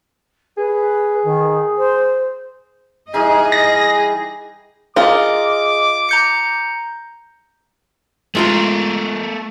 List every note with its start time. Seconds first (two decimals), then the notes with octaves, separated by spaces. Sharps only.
0.57 G#4 B4
1.24 D#3
1.77 C5
3.14 E3 G3 D#4 G#4 D#5
3.52 A#6
4.96 F4 G#4 A#4 D#5 D6
6.09 A#5 G6 C#7
8.35 G#3 A3 F4 A#4 A#5